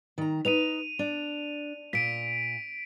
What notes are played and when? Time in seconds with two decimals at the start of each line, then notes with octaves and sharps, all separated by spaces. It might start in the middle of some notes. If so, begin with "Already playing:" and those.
0.18 D#3 A#5
0.45 D#4 B4 D#7 F7
0.99 D4
1.93 A#2 B6 D7 D#7